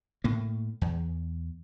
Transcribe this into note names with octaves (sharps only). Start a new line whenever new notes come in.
A2 A#3
E2